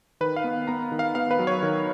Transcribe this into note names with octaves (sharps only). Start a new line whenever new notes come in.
D#3 B4
F5
B3
B3 A#5
D#3
F5
B3 F5
B4
F#3
C#5
D#3